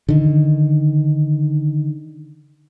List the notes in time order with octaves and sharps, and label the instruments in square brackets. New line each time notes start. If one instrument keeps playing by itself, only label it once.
[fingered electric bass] D3 D#3